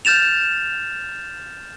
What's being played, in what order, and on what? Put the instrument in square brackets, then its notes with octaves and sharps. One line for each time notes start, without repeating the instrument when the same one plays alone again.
[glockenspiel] F6 G6 A6 E7 F7